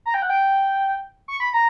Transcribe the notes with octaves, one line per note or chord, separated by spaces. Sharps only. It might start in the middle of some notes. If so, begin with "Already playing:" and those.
A#5
G5
F#5
G5
C#6
B5
A#5